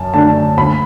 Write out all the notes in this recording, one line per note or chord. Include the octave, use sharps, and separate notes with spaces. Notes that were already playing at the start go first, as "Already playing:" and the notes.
Already playing: F#2 A5
D3 A3 D4 A5
D2 B5